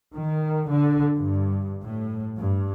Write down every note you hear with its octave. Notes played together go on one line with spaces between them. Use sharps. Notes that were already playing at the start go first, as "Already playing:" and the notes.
D#3
D3
G2
A2
G2